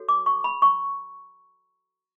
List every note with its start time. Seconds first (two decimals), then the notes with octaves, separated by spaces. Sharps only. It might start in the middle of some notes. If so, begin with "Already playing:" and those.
Already playing: F#4 A4 C#5
0.09 D6
0.26 C#6
0.44 B5
0.62 C#6